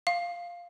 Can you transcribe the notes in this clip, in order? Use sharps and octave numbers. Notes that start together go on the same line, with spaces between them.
F5